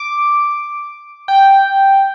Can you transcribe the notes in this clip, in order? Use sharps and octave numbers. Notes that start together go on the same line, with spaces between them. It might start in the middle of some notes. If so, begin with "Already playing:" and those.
Already playing: D6
G5